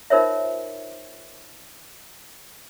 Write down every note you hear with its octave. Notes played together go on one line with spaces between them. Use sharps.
D#4 F4 A#4 C5 C#5 E5